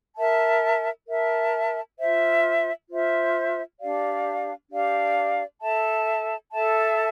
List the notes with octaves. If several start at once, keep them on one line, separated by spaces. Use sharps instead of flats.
A#4 E5 A5
A#4 E5 A5
F4 C5 E5
F4 C5 E5
D4 G4 D5 F5
D4 G4 D5 F5
A4 E5 A5
A4 E5 A5